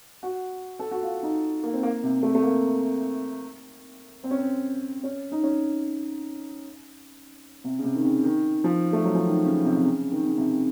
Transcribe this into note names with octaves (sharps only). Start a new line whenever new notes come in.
F#4
A4
F#4
F4
D#4
A#3
C4
A#3
C3
A3
A3
A#3
C4
C#4
C4
C#4
D#4
C#4
C3
C#3
C3
D#3
C#3
D#3
F3
A3
F#3
F3
D#3
C#3
C3
C3
C#3
D#3
C#3
C3